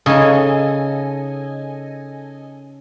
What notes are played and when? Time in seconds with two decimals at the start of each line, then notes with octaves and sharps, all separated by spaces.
0.06 C#3 D#4 A4 D#5 G#5